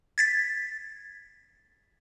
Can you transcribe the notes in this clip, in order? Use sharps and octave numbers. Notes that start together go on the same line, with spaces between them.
G#6 A6 B6